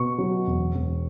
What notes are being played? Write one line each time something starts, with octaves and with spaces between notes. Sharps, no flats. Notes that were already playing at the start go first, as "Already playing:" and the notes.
Already playing: B2 C#6
F#3
E1
E1